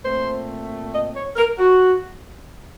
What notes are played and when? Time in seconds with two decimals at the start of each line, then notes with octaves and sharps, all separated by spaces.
0.03 A#2 A3 C4 C5
0.92 D#5
1.14 C#5
1.36 A#4
1.58 F#4